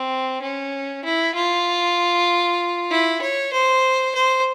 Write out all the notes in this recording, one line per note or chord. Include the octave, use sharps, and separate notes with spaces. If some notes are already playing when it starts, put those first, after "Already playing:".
Already playing: C4
C#4
E4
F4
E4
C#5
C5
C5